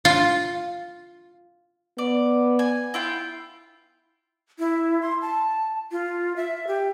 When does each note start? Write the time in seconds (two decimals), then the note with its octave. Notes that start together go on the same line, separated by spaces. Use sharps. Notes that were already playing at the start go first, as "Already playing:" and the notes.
0.05 F4
1.98 B3 D5
2.59 G#5
2.94 E4 F4 G5
4.59 E4
5.02 C6
5.22 A5
5.91 F4
6.36 E5
6.67 G4